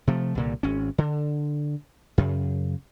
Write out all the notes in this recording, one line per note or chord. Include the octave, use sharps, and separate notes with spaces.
C3 F3 A3
C2 A#2 D3
G#1 C#4
D3
F#2 C#3